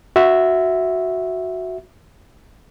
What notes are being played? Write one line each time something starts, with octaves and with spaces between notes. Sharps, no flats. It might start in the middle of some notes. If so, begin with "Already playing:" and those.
F#4 E5